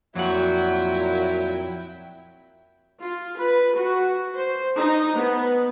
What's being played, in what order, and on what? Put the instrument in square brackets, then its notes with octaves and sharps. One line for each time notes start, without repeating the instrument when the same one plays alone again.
[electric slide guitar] F2 F#4 [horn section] A#2 F#3 [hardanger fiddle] E4 G5
[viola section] F4
B4
F#4
C5
D#4
B3